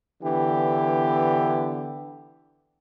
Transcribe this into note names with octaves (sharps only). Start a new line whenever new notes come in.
D3 E3 B3 D4 G4